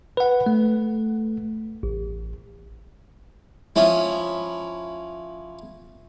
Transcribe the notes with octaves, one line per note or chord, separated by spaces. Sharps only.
B4 F#5
A3
A1
F3 C#4 E4